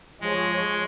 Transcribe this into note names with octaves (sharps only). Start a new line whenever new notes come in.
F3 G#3 G#4 C#5